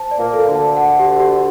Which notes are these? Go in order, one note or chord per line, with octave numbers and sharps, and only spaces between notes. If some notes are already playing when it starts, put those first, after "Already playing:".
Already playing: C5 A5
D5
A#2 A#3
A4
D2 D3
A5
F#5
G4
G4